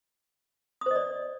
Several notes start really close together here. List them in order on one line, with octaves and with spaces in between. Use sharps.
D#6 C5 D#5 D5